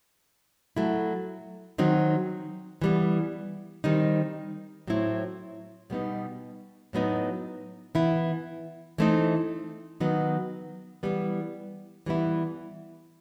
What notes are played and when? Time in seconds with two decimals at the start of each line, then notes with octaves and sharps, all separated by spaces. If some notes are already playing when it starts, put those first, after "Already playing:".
0.77 F#3 A3 E4
1.78 D#3 F#3 C4 D#4
2.82 E3 G3 B3
3.84 D#3 G3 C4 D#4
4.87 A2 F#3 C4 E4
5.90 B2 G3 B3 D#4
6.93 A2 F#3 B3 D#4
7.95 E3 B3 E4
8.98 E3 A3 C4 D#4
10.00 D#3 F#3 B3 D#4
11.03 E3 G3 B3
12.06 E3 G3 B3 E4